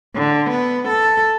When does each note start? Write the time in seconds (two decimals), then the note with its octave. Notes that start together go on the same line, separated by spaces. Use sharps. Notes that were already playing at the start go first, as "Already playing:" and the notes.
0.16 D3
0.51 B3
0.89 A4